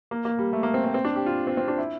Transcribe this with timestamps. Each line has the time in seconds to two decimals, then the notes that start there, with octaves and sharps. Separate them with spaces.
0.11 A#3
0.25 A#3
0.39 G3
0.53 A3
0.63 A#3
0.74 C4
0.84 C4
0.94 C4
1.05 D4
1.16 G4
1.26 F4
1.47 C4
1.57 C4
1.68 D4
1.78 E4